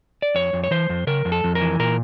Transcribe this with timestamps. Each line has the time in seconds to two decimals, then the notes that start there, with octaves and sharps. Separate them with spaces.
0.22 D5
0.35 F2 C#5
0.53 F2
0.64 C#5
0.71 E3 C5
0.89 F2
1.07 C#3 A#4
1.25 F2
1.32 A4
1.44 F2
1.55 A#4
1.61 E3
1.80 A#2 A#4